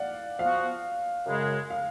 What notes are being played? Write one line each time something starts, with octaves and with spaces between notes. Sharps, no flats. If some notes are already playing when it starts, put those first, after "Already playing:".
Already playing: D5 F5 F#5
F3 B3 F#4 F5
F#2 C#3 G#3
F5